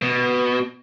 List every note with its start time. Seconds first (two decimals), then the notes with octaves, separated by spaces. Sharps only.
0.02 B2